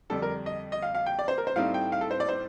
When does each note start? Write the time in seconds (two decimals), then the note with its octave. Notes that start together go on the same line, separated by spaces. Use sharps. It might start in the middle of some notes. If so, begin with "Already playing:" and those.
0.10 F2 D3 G3 D4 A4
0.22 A#4
0.46 D#5
0.72 D#5
0.82 F5
0.95 F5
1.06 G5
1.19 D5
1.28 C5
1.38 A#4
1.47 C5
1.56 A2 G3 C4 D#4 F5
1.74 G5
1.92 F5
2.01 A4
2.11 C5
2.20 D5
2.29 C5